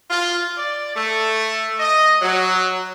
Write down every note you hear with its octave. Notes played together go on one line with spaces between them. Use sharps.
F4
D5
A3
D#5
F#3